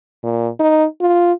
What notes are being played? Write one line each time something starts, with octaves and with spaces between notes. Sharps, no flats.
A#2
D#4
F4